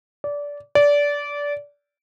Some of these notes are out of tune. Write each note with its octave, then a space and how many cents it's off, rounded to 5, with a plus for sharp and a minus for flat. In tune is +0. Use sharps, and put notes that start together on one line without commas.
D5 -20
D5 -20